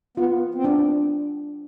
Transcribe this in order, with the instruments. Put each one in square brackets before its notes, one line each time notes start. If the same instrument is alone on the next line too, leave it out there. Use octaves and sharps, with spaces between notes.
[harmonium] B3 [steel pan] F4
[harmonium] C4
[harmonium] B3 [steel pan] D4